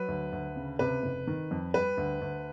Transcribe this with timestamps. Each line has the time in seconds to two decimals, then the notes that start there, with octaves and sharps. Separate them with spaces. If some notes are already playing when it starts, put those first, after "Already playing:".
Already playing: F#3 B4
0.08 D2
0.32 D2
0.56 C#3
0.79 C3 B4
1.03 F1
1.27 D#3
1.51 F2
1.74 G3 B4
1.97 D2
2.21 D2